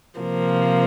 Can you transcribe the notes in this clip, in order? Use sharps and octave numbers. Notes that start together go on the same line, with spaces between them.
C3 F3 A#3